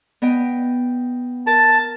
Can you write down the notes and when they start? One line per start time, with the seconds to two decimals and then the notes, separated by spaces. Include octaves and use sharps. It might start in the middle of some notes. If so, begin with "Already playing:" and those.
0.22 B3 D#5 G5
1.47 A#4 A5